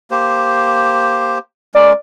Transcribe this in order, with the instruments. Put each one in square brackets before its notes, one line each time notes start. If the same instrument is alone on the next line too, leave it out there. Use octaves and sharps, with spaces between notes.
[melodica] A#3 G4 C5
[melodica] G#3 C#4 A#4 [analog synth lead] D5